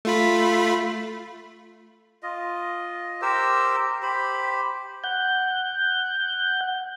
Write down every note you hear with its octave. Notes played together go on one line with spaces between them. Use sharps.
A3 F4 B5
F4 D#5
G4 A#4 C5 E6
G4 C5 B5
F#5 G6